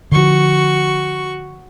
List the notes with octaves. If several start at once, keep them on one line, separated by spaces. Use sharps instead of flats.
D3 F3 F#4 C#6